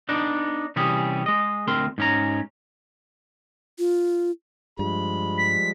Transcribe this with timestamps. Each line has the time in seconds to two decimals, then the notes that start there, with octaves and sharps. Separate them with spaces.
0.09 B3 D4 D#4
0.76 C3 E3 G3 C#4 G4 G#4
1.26 G#3 D#5
1.68 D2 C4 A#4 C6
1.98 G#2 C#4 A#5
3.78 F4
4.79 G2 F3 G3 G#3 B5
5.37 B6